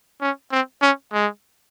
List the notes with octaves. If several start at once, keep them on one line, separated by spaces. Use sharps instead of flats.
C#4
C4
C#4
G#3